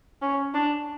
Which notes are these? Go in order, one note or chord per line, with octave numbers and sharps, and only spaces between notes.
C#4
D4